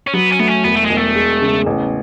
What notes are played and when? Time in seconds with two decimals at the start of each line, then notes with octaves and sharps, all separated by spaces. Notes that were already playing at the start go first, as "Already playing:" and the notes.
0.07 C#4
0.13 F#3 B3
0.31 C#4
0.39 A3 B3
0.48 C#4
0.64 E1 B3
0.75 A3
0.85 E1 G#3
0.97 A3
1.15 G#3
1.41 C#3
1.66 A1